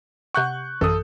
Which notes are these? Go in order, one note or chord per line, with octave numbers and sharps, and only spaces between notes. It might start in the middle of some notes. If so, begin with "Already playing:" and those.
C3 F#5 C#6 F#6 G6
A1 F#2 A4 D#6